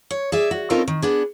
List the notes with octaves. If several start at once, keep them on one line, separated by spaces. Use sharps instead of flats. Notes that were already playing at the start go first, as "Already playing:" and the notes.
C#5
G#4 D5 E5
F#4
C#3 A3 C4 D#4 F4 A#4
D#3
B3 D4 G#4